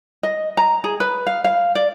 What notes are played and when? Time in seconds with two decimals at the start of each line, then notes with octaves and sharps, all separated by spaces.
0.23 D#5
0.57 A#5
0.84 G#4
1.00 B4
1.27 F5
1.44 F5
1.75 D5